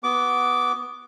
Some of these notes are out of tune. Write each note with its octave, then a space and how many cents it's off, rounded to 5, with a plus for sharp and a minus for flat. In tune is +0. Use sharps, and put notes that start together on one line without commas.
B3 +0 F#4 +0 D6 -15